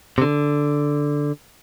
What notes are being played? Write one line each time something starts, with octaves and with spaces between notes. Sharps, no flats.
C3
D3